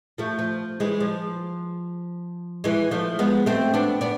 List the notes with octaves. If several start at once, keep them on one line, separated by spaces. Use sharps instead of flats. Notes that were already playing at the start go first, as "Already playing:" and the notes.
F3 A3
F3
E3 G#3
F3
E3 G#3
F3 A3
G#3 B3
A3 C4
B3 D4
B3 D4